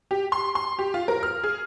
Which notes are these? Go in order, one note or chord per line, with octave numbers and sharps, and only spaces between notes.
G4
C6
C6
G4
F4
A#4
F6
G#4